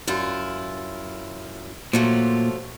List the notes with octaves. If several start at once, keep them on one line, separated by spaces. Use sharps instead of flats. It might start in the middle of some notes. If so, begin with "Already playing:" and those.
F#2 E4 F4
A#2 F3 F#3 A3